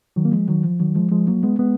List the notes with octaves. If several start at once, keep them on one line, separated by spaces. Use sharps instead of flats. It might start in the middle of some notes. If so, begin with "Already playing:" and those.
D#3 F#3
A#3
F3 G#3
D#3 F#3
F3
D#3 F#3
F3 G#3
F3 G#3
F#3 A#3
G#3 B3
G#3 B3